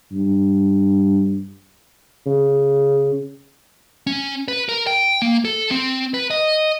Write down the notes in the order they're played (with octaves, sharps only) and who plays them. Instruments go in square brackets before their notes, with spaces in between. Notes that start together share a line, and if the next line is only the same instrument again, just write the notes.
[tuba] G2
C#3
[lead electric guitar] C#4
B4
A#4
G5
A#3
A4
C4
B4
D#5